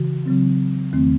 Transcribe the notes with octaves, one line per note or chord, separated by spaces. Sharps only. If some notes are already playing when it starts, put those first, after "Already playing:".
Already playing: C#3 E3 F#4
C#3 F#3 C4
E2 D#3 A3 C4